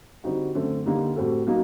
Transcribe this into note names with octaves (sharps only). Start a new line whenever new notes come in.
D3 G3 C4 D#4 F#4
F#2 D3 A3 C4
D3 G3 A#3 D#4 G4
A2 G3 C4 F#4 A4
F#3 A#3 D#4